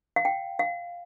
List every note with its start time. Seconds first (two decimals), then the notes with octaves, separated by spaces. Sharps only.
0.16 F5
0.25 G5
0.59 F5